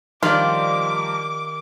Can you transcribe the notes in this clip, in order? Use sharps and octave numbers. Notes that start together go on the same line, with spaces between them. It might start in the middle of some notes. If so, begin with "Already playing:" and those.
D#3 F3 G3 D#4 F4 G4 D5 D6